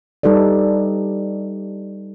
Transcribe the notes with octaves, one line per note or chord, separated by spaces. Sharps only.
G3 D#4 A4 B4 D5